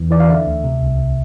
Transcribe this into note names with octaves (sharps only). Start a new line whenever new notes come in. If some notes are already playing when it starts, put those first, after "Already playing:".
Already playing: E2 E3
E3 D5
F5
D3 E5
D2
C3
C2